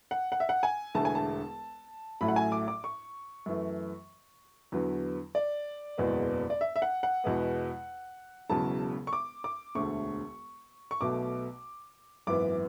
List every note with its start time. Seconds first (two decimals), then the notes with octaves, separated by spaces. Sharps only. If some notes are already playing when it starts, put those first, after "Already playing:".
0.11 F#5
0.32 F#5
0.40 E5
0.49 F#5
0.63 G#5
0.95 E1 E2 D3 A3 A5
1.05 G#5
1.15 A5
2.21 A1 A2 F#3 A3 B5
2.28 F#5
2.36 G#5
2.52 D6
2.68 D6
2.84 C#6
3.46 F#2 E3 A3
4.72 E2 D3 F#3 B3
5.35 D5
5.98 F#1 E2 B2 G#3 B3
6.50 D5
6.61 E5
6.76 E5
6.82 F#5
7.03 F#5
7.24 E2 B2 G#3 B3
8.50 E1 E2 C#3 F#3 A5
9.07 C#6
9.13 D6
9.44 D6
9.75 E1 D2 D3 A3 C#6
10.91 C#6
11.01 B1 B2 A3 D6
12.27 G#1 F#2 E3 B3 D6